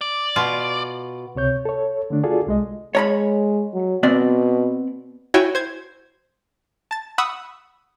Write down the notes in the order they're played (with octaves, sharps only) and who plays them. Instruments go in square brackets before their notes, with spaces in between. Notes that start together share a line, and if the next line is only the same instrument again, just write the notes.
[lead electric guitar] D5
[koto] B2 F4
[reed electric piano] C#2 C3 C#5 G6
A4 C#5
D3 A3 D4
F4 F#4 G#4 A4 D5
C2 G#3 D#5
[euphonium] G#3 [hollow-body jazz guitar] C#5 A#5 B5
[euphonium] F#3
[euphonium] B2 [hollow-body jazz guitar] B3 C4 D5
[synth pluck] E4 F#4 C#5 G5 G#5 C#6
C5 G#6
A5 A6
F#5 B5 C#6 D#6 E6